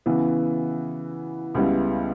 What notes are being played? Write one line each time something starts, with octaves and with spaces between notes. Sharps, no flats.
C#3 E3 B3
C#2 C#3 G3 B3 E4